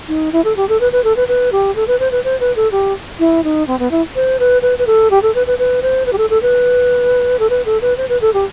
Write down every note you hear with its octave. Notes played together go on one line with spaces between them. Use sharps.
D#4
E4
A4
G4
A4
B4
B4
A4
B4
B4
G4
A4
B4
C5
B4
C5
B4
A4
G4
E4
D#4
C4
B3
E4
C5
B4
B4
B4
A4
G4
A4
B4
B4
B4
C5
B4
G4
A4
A4
B4
A4
B4
A4
B4
C5
B4
A4
G4